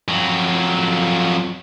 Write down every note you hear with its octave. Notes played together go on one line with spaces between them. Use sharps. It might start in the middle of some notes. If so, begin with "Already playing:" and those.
F2 F#3